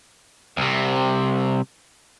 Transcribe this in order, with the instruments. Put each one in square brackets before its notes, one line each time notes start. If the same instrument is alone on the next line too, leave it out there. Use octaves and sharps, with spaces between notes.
[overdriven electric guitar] C2 C3